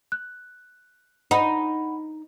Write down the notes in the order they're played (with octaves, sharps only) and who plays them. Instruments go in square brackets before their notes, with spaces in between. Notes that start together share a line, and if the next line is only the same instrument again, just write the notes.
[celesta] F#6
[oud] D#4 [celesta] F#5 B5